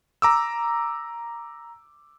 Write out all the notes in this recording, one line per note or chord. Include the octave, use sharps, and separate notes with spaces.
A#5 D6 E6